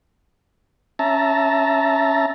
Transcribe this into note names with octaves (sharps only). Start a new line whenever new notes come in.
C#4 E5 A5 A#5